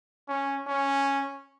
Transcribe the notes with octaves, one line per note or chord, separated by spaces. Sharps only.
C#4
C#4